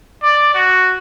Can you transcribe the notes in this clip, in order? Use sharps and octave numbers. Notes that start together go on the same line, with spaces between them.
D5
F#4